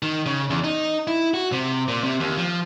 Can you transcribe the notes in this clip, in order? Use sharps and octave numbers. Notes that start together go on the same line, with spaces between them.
D#3
C#3
E2
D#4
E4
F#4
C3
A#2
C3
D#2
F3